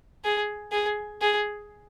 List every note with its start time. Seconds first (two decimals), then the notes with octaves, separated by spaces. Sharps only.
0.24 G#4
0.72 G#4
1.21 G#4